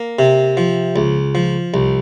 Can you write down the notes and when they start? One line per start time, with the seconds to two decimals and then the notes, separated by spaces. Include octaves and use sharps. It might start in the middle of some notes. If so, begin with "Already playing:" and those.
Already playing: A#3
0.19 C3
0.57 F3
0.96 C#2
1.35 F3
1.74 C2